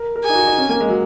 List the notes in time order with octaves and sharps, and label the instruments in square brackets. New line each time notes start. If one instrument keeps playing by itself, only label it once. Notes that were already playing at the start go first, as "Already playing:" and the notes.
Already playing: [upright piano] A#4
A#4
[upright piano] G#4 [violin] G#5
[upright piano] D#4
F#4
D#4
C#4
A#3
G#3
F#3